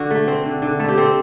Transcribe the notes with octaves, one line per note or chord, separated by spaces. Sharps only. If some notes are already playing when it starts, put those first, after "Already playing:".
Already playing: D3 F#4
A3
C4
D3
D3
A3 A4
G4
C4 A4